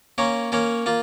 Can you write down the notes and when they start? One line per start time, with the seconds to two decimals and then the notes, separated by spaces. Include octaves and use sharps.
0.18 A#3 C#4 A#4 C#5
0.52 A#3 C#4 A#4 C#5
0.86 A#3 F4